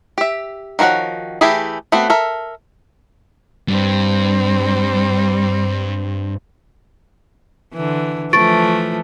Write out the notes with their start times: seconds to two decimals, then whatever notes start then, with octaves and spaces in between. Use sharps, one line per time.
0.18 G4 E5
0.79 D#3 F3 F#4 C#5 F#5
1.41 E3 A3 E4 G4 G#4
1.92 A3 B3 C4 F#4
2.10 A4 A#4 E5
3.68 G2 G3 C4
7.74 D3 E3
8.33 E3 F3 A3 C#6 A6 D7